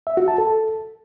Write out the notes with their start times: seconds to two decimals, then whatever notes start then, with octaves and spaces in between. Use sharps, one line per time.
0.07 E5
0.17 F#4
0.28 A5
0.38 A4